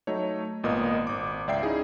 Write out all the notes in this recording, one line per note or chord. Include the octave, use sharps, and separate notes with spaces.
F#3 A3 D#4 C#5
G#1 A#2 B3 A#4 D#5 D#6
G#1 D6
C#2 D5 E5 G5 C7
C#4 D#4 E4 G#4